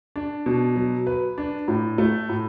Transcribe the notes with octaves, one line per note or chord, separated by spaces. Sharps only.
D4
B2
F#3
B4
D4
A2
A3
A2